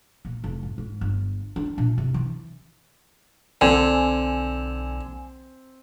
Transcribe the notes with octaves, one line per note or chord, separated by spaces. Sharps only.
A#2
F1
G#2
G#2
G1
D4
A#2
C3
E3
B1 D3 C4 G#5